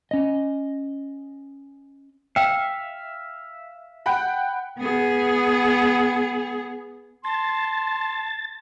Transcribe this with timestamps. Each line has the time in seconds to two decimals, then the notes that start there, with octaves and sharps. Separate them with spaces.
0.11 C#4 D#5
2.36 E5 F5 G5
4.06 F#5 G5 B5
4.78 B3 G#4
7.25 A5 C6 A6